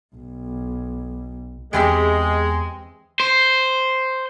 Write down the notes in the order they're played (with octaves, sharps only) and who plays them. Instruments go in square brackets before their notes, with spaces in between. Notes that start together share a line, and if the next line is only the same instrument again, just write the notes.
[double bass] B1
[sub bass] E2 [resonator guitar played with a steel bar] E3 C4 G4 [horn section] G#3
[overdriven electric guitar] C5